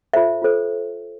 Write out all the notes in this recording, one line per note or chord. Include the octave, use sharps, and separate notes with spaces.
F4 A4 C5 E5
F4 A4 C5